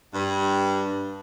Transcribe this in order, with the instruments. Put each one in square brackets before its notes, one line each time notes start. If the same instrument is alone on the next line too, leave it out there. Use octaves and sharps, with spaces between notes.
[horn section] G2